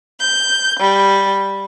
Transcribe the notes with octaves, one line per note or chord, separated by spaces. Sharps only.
G6
G3